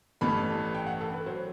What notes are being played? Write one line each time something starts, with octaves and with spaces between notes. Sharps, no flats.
A1 G2 E3 A3 B5
G5
F#5
A4
B4
F#3 C5